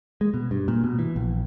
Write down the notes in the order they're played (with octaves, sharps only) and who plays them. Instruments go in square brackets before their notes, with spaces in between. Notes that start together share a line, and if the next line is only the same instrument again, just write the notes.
[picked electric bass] G#3
B2
G2
A#2
B2
E3
A#1